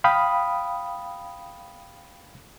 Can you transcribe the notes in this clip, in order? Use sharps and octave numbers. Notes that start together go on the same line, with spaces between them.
F5 G5 B5 D#6